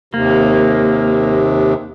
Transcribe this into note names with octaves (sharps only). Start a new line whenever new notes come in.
D#2 C3 A#3